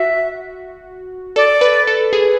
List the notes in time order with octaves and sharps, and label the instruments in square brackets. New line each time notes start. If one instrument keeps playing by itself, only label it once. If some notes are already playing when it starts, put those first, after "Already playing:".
Already playing: [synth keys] F#4 [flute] E5
[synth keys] A4 [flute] D5
[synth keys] B4
A4
G#4